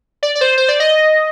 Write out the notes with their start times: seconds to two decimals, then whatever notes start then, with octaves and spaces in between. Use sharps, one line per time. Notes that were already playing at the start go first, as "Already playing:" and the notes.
0.23 D5
0.35 D5
0.41 C5
0.58 C5
0.68 D5
0.80 D#5